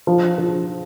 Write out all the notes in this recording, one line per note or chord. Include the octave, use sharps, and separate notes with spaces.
F3
F3